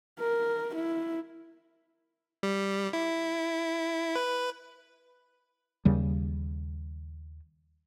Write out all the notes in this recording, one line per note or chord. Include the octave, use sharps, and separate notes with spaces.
A#4
E4
G3
E4
B4
D#2 C#3 G3